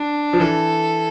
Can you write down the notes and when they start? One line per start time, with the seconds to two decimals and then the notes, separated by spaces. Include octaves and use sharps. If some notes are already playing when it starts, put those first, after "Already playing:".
Already playing: D4
0.33 F3
0.40 E3 A4